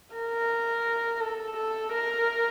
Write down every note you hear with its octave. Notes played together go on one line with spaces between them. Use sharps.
A#4
A4
A4
A#4